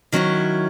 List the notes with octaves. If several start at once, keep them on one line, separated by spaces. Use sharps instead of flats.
D#3 F#3 C#4 E4